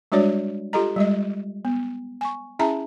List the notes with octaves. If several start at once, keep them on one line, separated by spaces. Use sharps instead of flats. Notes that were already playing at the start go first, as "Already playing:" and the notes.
G3 G#3 D4 F#4 C#5 D5
F4 G4 A4 D#5 A#5
G3 G#3 D#5
B3
G#5 C#6
C#4 E4 G#4 E5 A5 A#5